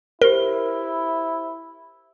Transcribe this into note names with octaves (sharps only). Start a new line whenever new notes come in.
E4 G4 A#4 C5 G7